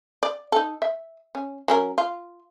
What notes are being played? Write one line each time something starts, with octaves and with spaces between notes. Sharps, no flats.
D5
D#4 A4
E5
C#4
F#3 C#4 A#4
F4